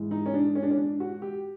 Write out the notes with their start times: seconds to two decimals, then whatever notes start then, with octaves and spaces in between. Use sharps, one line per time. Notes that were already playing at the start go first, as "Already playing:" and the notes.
Already playing: G#2 E3
0.11 D#4
0.26 C#4
0.34 D4
0.55 C#4
0.63 D4
0.70 C#4
0.77 D4
1.00 F#4
1.22 G4